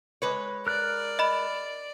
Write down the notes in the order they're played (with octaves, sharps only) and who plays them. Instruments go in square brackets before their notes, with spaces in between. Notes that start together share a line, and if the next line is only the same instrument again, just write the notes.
[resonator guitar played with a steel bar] G#3 B4 C#5
[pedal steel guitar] A#4 F#6 [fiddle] D5
[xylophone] D#5 B5